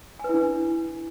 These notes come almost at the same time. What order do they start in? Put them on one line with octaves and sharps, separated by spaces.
G#5 B4 E4 D4